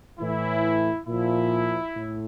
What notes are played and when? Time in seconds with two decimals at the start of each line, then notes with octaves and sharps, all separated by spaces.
0.20 A2 E3 E4
1.07 A#2 F3 E4
1.96 A2